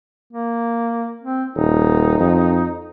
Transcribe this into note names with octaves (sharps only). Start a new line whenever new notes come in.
A#3
C4
D#1 D#4
F2